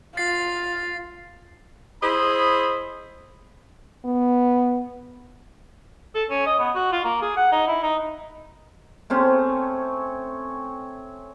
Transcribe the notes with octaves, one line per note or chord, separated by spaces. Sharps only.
F4 A6 C7
E4 G#4 C5 D#5 B5
B3
A4
C#4
D#5
B3
F#4
F4
A#3
G#4
F#5
D#4
E4
D#4
A3 C4 C#4